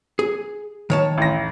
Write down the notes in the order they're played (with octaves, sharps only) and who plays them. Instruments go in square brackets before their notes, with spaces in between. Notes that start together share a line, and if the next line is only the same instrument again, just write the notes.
[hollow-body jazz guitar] G#4
D#3 C#5 A5
[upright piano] A1 A#6